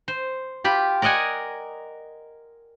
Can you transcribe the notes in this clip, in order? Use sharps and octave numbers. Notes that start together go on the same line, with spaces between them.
C5
F4 G4 B5
A#4 D5 D#5 F#5 G#5